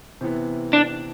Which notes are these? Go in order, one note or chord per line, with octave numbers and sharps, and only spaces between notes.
C3 E3 B3 E4
D4